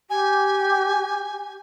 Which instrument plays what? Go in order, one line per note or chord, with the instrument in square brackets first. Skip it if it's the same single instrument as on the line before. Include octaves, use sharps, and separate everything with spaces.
[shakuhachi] G4 [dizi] G#5